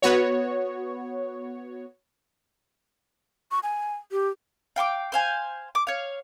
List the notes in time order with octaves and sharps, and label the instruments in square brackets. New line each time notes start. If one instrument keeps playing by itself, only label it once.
[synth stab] B3 F#4 C#5
[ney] C#6
G#5
G4
[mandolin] F5 G5 C#6 D6
C5 F5 G#5
D6
C#5 F5